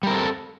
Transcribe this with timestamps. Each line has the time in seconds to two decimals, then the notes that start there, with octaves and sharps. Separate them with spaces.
0.03 G3
0.07 A#4
0.10 C4
0.14 A4